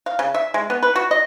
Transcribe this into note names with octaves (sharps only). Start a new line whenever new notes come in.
F5
C#3
E5
G#3
B3
B4
F#4
D#5